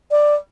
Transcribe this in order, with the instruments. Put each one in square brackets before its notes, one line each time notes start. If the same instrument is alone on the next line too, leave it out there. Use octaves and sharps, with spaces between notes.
[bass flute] D5